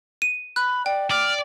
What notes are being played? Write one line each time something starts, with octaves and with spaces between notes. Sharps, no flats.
D#7
B5 F#6
D5 G5
D5 F6